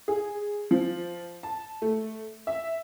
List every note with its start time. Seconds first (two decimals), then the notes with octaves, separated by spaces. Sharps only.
0.08 G#4
0.71 F3
1.43 A5
1.82 A3
2.47 E5